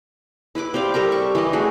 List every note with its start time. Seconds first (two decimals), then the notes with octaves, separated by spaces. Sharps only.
0.55 E4 B4 B5 D6
0.74 C4 G4 D5 F5
0.94 G3 A4 A#4 A#5
1.12 C#6
1.35 E3 G3 D#5
1.53 A3 F#4 G#4